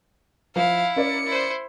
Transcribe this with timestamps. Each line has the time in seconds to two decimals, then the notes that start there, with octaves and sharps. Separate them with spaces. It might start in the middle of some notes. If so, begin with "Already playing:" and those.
0.56 F3 E4 F5
0.96 C#4 A#4 D5 C#7
1.27 E4 C5